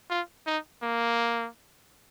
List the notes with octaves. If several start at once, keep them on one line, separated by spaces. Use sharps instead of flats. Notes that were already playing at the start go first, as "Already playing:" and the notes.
F4
D#4
A#3